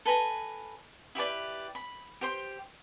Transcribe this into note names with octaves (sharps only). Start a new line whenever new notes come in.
A4 B4 G#5 A#5
E4 G4 B4 D5
B5
G4 C5 C6